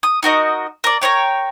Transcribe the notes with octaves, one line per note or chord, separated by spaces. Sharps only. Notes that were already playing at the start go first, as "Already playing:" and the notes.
D#6
D#4 F#4 A#4 D#5
A#4 D5
A#4 B4 C#5 G5